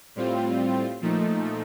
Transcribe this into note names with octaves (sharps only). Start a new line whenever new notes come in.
A2 G3 C4 F4
A#2 F3 A3 D#4